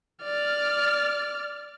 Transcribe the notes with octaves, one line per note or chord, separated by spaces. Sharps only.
D5 F6